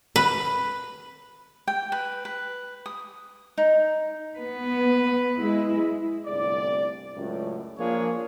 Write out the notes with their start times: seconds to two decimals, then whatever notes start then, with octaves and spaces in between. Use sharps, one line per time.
0.16 B4
1.68 G5
1.92 B4
2.25 B4
2.86 D#6
3.58 D#4
4.38 B3 B4
5.37 G#3 E4
6.27 G1 C2 A2 D5
7.15 C#2 F#2 A2
7.77 F3 A#3 D4 F4 G#4 C#5